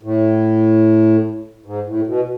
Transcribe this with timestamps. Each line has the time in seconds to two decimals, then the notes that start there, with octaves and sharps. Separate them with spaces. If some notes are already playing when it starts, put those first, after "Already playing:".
0.03 A2
1.66 G#2
1.86 A2
2.07 B2